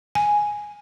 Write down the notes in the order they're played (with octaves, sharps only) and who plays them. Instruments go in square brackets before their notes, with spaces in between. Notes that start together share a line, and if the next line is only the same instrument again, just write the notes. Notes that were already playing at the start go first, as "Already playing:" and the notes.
[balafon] G#5